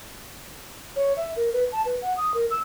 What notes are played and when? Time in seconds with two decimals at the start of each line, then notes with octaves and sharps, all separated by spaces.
0.96 C#5
1.17 E5
1.36 A#4
1.53 B4
1.72 A5
1.85 B4
2.02 F#5
2.17 D#6
2.34 A#4
2.51 E6